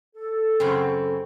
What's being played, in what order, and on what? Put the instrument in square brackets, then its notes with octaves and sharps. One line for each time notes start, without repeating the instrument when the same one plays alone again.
[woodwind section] A4
[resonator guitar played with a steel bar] F#2 C#3 C4